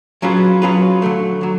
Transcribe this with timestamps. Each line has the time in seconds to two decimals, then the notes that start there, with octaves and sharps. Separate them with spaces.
0.22 F#3 C#4 F4 G#4 B4
0.62 F#3 C#4 F4 G#4 B4
1.02 D3 F#3 A3
1.41 D3 F#3